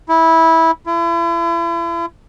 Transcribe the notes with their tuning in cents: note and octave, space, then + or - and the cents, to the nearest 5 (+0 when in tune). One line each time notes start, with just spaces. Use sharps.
E4 -15
E4 +40